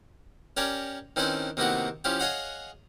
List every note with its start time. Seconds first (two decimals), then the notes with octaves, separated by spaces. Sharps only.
0.57 C#4 G4 A#4 C#5 D5
1.16 D#3 C4 C#4 E4 B4 C5
1.57 C3 D#3 A#3 B3 E4 F#4
2.04 F3 C#4 E4 F4 G4
2.20 G#4 C#5 D#5 F5 F#5